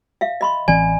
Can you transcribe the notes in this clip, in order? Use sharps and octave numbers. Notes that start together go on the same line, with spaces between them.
E5 F5
D#5 B5 C6
A1 E3 C4 D5 G#5